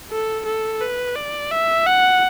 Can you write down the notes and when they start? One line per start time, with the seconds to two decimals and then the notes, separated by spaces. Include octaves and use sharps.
0.11 A4
0.46 A4
0.81 B4
1.16 D5
1.51 E5
1.87 F#5